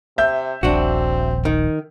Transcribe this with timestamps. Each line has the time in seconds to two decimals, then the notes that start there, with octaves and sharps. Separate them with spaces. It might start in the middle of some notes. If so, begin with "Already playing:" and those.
0.18 C3 E5 G6
0.63 D#1 A#1 C4 D4 F#4
1.45 D#3